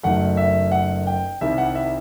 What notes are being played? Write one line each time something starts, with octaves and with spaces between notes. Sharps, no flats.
F#1 F#2 D#3 A3 F#5
E5
F#5
G5
C2 C3 D#3 G3 E5
F#5
E5